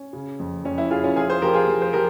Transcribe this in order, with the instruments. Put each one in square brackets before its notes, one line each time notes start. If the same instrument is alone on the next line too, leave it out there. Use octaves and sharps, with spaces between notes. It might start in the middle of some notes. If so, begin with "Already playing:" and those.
Already playing: [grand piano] C#4
C#3
F2
F2 C#4
E4
F2 F4 G#4
C#4 F4
F3 F4 G#4
G#4 C5
F3 G4 A#4
F4 G#4
F3
C5
F3 G4 A#4